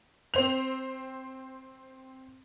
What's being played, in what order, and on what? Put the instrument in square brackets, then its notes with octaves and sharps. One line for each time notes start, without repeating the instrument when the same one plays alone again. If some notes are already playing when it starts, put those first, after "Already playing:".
[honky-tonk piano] C4 C5 F7